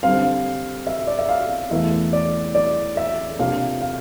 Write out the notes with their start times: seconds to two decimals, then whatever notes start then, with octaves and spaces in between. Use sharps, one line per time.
0.03 D3 G3 C4 F5
0.87 E5
1.07 D5
1.19 E5
1.29 F5
1.71 E2 E3 A3 E5
2.13 D5
2.55 D5
2.97 E5
3.39 C3 F3 A#3 D4 F5
3.81 F5